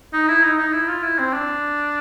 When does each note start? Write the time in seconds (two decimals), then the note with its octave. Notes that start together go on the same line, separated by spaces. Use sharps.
0.13 D#4
0.28 E4
0.43 D#4
0.58 D#4
0.73 E4
0.88 F4
1.03 E4
1.18 C4
1.33 D4